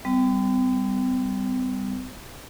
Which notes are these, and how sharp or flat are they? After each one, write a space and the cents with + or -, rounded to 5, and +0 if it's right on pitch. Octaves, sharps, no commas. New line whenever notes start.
G3 +0 C4 -45